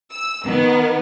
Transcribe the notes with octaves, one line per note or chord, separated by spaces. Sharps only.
E6
D#3 B3